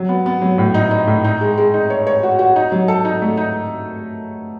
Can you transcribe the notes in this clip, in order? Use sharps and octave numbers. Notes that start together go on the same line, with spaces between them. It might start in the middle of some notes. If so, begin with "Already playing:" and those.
Already playing: F#3
B3
B3
F#3
A2
D#4
D#4
A2
D#4
G#3
G#3
D#4
C#5
C#5
F#4
F#4
D#4
F#3
A4
D#4
A3
D#4